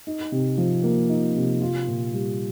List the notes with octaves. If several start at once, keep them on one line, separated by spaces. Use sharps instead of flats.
D#4
C3
F3
A#3
D#4
C3
F4
A#2
G3